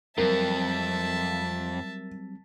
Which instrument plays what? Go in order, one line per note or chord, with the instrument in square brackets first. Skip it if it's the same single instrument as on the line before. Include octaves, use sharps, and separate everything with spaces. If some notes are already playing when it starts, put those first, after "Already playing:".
[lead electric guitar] F2 [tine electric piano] F#3 G3 C4 [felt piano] A#4 [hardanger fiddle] E5 A5